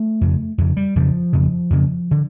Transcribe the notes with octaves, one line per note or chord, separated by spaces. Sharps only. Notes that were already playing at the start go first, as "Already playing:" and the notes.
Already playing: A3
F2 C#3
F2 C#3
G3
F2 C#3 F3
F2 C#3
F2 C#3
D3